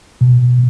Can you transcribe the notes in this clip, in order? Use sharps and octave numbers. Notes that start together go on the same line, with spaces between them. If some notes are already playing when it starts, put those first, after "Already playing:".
B2